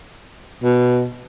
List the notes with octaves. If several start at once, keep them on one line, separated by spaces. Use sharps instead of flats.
B2